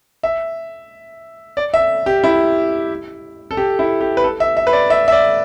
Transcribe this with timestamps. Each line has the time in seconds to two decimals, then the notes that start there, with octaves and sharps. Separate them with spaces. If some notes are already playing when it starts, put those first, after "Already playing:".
0.23 E5
1.57 D5
1.74 E5
2.06 G4
2.24 E4
3.51 A4
3.57 G4
3.79 E4
4.01 G4
4.17 B4
4.24 A4
4.40 E5
4.57 E5
4.67 B4
4.73 D5
4.90 E5
5.08 E5
5.12 D5